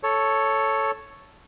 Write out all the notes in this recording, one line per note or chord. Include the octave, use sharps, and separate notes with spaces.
A4 C#5